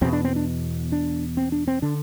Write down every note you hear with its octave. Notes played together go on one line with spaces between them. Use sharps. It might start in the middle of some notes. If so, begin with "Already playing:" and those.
E2 B2 C4
D4
C4
D4
D4
C4
D4
C4
D3 D4